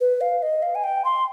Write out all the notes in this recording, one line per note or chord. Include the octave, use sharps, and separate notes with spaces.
B4
F5
D#5
F5
G#5
G5
C6